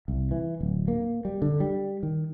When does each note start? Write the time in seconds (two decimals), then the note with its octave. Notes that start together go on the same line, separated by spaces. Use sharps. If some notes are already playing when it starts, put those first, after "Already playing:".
0.08 C2
0.31 E3
0.61 D1
0.88 A#3
1.25 G3
1.42 D3
1.60 G3
2.03 D#3